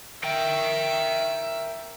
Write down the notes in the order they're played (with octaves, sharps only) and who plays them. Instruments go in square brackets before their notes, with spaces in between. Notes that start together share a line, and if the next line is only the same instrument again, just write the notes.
[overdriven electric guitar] A#4 G5 [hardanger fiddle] E5